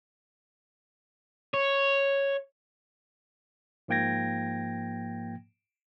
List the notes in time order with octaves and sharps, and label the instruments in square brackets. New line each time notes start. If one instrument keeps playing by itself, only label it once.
[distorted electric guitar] C#5
[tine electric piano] G#2 F3 A#3 G5 G#6 A#6